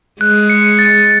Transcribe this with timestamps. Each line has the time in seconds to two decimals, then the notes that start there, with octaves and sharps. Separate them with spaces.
0.21 G#3 F#6
0.50 C#7
0.79 A6